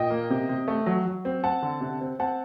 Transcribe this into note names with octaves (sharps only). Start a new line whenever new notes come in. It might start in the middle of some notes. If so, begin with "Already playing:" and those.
Already playing: A#2 D#5 G5
A#3
C3
C3
A3
F#3
F#3
C4
C4 F#5 A5
D3
C3
C4
C4 F#5 A5